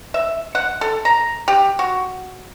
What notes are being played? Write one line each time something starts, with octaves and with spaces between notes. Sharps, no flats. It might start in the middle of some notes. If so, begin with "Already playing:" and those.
E5
F#5
A4
A#5
G4
F#4